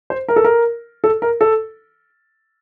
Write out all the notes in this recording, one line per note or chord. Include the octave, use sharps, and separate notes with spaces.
C5
A#4
A4
A#4
A4
A#4
A4